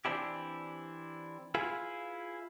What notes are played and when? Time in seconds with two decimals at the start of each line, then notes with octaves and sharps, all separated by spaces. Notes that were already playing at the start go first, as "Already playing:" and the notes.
0.05 E3 C4 D4 E4 G4
1.55 E4 F4 G#4 B4